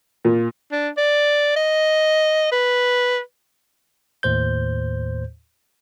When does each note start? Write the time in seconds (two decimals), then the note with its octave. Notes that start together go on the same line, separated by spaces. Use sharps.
0.25 A#2
0.72 D4
0.98 D5
1.56 D#5
2.52 B4
4.23 D#2 A2 C5 G6